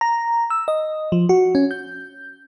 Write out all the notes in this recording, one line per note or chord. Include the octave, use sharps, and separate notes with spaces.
A#5
E6
D#5
F3
F#4
C#4
G6